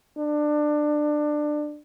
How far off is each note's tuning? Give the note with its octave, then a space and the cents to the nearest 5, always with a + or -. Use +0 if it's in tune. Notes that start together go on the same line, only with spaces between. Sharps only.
D4 +20